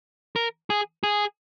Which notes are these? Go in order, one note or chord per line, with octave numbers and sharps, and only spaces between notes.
A#4
G#4
G#4